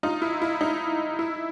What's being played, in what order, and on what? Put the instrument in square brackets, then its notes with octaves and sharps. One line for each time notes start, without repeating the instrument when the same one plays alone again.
[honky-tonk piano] D#4 F4
E4
E4
D#4
E4